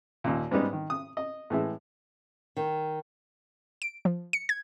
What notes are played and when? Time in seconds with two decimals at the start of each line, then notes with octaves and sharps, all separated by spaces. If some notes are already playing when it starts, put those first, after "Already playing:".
0.24 D#2 A#2
0.51 G#2 G3 B3 D#4
0.73 D#3
0.90 D#6
1.17 D#5
1.50 A2 E3 G#3 E5
2.57 D#3
3.82 D7
4.05 F3
4.33 C#7
4.49 G#6